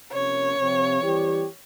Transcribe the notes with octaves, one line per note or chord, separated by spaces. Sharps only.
C3 F3 A#3 C#4 C#5
C3 F3 C4
E3 G3 C4 G4